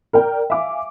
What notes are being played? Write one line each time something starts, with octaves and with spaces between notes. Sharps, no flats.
A#4 D5 G5
E5 F5 G#5 D6